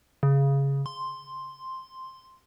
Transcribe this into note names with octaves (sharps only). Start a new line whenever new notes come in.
C#3
C6